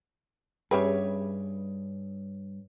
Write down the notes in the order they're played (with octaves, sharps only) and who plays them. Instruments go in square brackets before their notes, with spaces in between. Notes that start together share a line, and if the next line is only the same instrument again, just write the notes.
[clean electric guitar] G2 [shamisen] C#4 G4 B4 [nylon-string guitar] G#4 C#5 E5